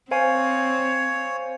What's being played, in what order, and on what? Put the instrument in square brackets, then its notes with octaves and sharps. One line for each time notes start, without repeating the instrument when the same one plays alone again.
[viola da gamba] C4 [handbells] C5 F5 G#5 [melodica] C#5